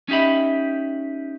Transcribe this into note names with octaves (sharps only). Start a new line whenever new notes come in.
C#4 D#4 G4 E5 B5